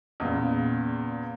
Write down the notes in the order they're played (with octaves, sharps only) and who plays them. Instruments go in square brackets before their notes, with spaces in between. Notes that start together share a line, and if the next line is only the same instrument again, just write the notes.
[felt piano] E2 A#2 C#3